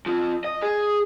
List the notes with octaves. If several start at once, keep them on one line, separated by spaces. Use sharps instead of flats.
F2 F3
D#5
G#4